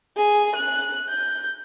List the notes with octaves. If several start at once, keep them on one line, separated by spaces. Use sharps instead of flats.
G#4
F#6
G6